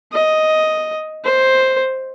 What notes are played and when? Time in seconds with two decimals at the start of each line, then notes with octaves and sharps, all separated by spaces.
0.13 D#5
1.25 C5